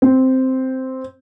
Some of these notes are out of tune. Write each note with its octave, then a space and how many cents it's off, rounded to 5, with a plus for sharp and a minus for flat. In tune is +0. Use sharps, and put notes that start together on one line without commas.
C4 -5